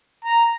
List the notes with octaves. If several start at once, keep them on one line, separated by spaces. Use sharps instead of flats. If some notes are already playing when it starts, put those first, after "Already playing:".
A#5